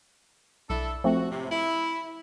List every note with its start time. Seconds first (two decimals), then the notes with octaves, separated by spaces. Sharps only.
0.70 B1 D4 E4 A4
1.04 F3 A3 C4 F#4
1.30 A2 C3
1.51 E4